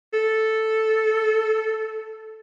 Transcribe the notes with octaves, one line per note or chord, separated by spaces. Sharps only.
A4